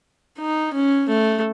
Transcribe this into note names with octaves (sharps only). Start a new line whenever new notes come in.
D#4
C#4
A3